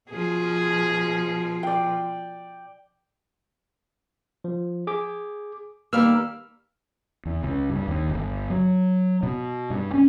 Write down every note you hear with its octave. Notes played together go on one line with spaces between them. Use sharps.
B2 F3 G#4
D5 G5
F3
G#4 D6
D#3 G3 A#3 E6 F6
E2
C#2
G2
D#2
G1
F#3
B2
G2
C#4